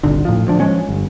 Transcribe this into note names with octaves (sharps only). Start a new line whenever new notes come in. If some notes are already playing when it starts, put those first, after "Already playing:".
D#1 G#1 D3
A2 F3
D2 F3 D4
F3 G#3 C#4
G1